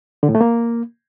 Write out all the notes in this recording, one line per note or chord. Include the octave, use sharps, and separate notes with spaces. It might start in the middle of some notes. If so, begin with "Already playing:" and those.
D3
A2
A3
A#3